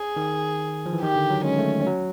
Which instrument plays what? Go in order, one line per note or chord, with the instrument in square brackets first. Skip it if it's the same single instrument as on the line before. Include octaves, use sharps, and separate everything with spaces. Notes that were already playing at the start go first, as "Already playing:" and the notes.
Already playing: [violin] G#4
[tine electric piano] D#3
F3
E3
[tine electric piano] D#3 [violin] G4
[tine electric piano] D3
F#3
[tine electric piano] G#3 [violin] C#4
[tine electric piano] A3
F#3